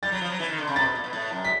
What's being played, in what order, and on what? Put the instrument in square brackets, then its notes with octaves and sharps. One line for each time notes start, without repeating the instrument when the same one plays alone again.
[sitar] G3 [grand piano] A6
[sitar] F#3
F3
F#3
E3
D#3
D3
C#3
[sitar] C3 [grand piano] A6
[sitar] B2
A#2
B2
A2
F#2
[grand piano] B6